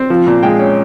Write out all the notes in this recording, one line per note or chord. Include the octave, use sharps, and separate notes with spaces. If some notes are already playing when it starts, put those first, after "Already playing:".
Already playing: C4
F3
A#2
G#3 G5
C#4